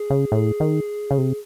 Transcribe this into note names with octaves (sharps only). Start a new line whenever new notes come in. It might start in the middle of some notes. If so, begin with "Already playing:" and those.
Already playing: G#4
C#3
A2
D#3
C#3
C3